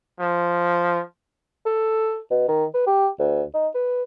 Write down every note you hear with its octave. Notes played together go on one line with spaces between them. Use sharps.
F3
A4
B2
D#3
B4
G4
D2
D#4
B4